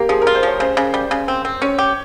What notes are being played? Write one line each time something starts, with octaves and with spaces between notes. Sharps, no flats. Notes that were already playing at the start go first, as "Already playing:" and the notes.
Already playing: A#3 G4
F3 G#4
A#4
F4
C5
F3 C#5
C#3 C5
C#3
G3
C#3
C4
C4
C#4 C#5
G4